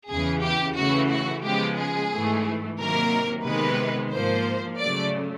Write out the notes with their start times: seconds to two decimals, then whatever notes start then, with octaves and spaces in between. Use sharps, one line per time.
0.10 E2 C#3 E3 G#4
0.44 G4
0.77 C#3 E3 A3 F#4
1.12 F#4
1.45 C#3 F3 G#3 B3 G4
1.78 G#4
2.12 G#2 E3 A3
2.79 C3 D#3 F#3 A#3 A#4
3.46 C3 D#3 G#3 B3 B4
4.12 G#2 F3 A#3 C5
4.79 C#3 F#3 A3 D5